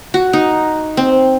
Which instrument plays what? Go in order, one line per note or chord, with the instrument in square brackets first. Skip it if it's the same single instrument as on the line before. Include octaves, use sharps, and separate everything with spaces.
[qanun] F#4
D#4
C4